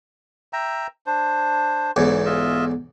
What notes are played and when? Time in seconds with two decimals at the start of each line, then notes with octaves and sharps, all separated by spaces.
0.53 E5 G5 A#5
1.06 D4 C5
1.96 B1 E2 G#2
2.25 F4 D#5 E5